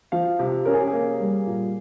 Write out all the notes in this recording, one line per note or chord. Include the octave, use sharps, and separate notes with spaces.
F3 F5
C3 G4
C#4 A#4
G#4
G4
G#4
A#3
G3
A#2